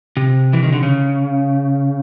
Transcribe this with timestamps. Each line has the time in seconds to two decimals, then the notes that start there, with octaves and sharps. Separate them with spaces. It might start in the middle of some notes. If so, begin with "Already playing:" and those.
0.17 C3
0.53 E3
0.63 D#3
0.72 D3
0.83 C#3